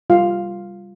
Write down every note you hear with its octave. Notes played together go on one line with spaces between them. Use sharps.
G3 F4 F5